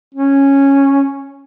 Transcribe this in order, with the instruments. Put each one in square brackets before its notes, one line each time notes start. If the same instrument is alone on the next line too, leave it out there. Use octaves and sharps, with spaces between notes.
[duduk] C#4